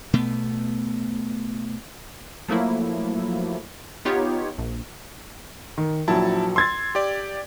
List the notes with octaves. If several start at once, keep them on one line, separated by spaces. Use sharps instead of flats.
B2 A3 B3
F3 F#3 A3 A#3 E4
B3 D#4 F4 G4 C#5
A#1
D#3
A#1 F#3 E4 A5
C6 E6 G#6 A6
G4 D5